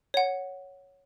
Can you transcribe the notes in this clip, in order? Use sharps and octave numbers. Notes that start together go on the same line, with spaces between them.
C#5 F#5